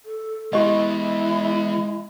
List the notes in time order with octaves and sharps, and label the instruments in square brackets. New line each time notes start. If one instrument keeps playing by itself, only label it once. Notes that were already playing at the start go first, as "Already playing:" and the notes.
[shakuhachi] A4
[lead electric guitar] E3 B3 [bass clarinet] G#3 [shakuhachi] E4 [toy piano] G4 D#5